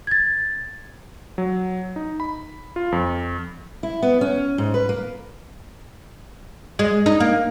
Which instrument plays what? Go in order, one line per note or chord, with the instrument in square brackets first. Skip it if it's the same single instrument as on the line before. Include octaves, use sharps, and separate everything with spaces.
[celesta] G#6 A6
[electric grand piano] F#3
D#4
B5
F4
F2
[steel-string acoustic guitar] E4
B3
C#4
G#2
B4
A#3
[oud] G#3
D#4
A#3